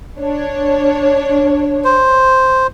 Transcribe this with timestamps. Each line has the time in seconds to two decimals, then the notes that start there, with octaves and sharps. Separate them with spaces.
0.20 D4 C#5
1.84 C5